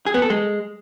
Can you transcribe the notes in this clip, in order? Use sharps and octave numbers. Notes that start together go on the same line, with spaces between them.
G#4
B3
A4
G#3